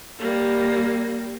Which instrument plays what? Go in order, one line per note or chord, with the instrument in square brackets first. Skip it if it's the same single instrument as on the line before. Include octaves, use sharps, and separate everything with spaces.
[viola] G3 A#3